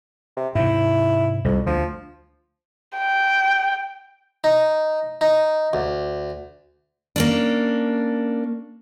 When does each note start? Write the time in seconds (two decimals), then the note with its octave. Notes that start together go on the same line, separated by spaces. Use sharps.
0.37 C3
0.55 G#2 C3 E4
1.45 C2 F2
1.66 D2 F3
2.98 G5
4.44 D#4
5.21 D#4
5.73 D2
7.16 A#3 C#4 D4